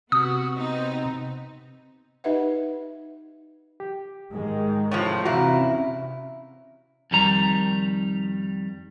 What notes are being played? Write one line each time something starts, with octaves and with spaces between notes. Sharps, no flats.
C3 B3 F#4 D#6
B3 C4 D#4
D#4 G4 B4 D#5 E5 F#5
G4
G#2 D#3 G#3
A2 C3 F3 C#5 A6
E2 C3 E4 F#4 F5 A#5
C#4
F2 D#3 G3 A#5